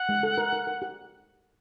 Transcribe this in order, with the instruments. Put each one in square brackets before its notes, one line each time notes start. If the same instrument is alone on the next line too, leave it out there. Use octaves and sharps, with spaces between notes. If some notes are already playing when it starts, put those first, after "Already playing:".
Already playing: [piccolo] F#5
[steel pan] G#3
A4
A#4
A#4
A#4
G4